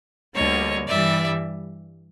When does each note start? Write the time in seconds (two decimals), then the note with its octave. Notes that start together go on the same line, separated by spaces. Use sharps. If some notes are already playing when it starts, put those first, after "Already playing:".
0.35 D2 D3 G3 A#3 C#5 D#5
0.88 G2 E3 G3 D5 E5